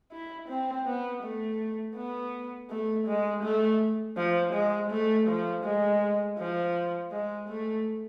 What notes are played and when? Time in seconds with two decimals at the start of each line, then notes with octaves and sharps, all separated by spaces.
0.12 E4
0.48 C4
0.86 B3
1.23 A3
1.96 B3
2.70 A3
3.07 G#3
3.43 A3
4.17 F3
4.53 G#3
4.90 A3
5.28 F3
5.64 G#3
6.38 F3
7.12 G#3
7.48 A3